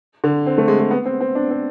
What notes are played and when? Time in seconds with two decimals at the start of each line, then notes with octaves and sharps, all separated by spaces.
0.24 D3
0.46 C4
0.58 A3
0.68 G#3
0.80 G#3
0.91 B3
1.06 C4
1.21 C4
1.35 D4
1.50 C4